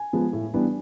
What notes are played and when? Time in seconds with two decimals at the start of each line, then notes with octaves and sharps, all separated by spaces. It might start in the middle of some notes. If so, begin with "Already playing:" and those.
Already playing: G#5
0.13 F3 G#3 B3
0.33 A2
0.53 E3 G3 B3 D4